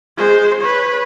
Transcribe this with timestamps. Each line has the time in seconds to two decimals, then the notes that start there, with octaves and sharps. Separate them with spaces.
0.17 G#3 C5
0.61 B4 C#5